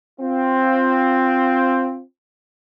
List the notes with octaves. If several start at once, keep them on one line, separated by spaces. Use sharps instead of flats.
C4 F4